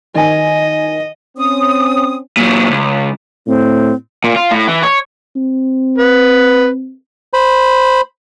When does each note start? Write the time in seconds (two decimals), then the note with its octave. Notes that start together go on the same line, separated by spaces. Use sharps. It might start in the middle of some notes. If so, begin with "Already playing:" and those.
0.15 D#3 D#5 G#5
1.37 C4 C#4 D#6
2.37 A#2 F#3
2.71 C#2
3.47 A2 C4
4.24 A#2
4.36 F4
4.51 A2
4.68 E3
4.83 C#5
5.36 C4
5.98 B4
7.33 C5 B5